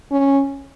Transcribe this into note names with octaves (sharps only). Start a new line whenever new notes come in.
C#4